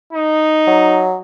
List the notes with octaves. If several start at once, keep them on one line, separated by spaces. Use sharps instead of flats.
D#4
F#3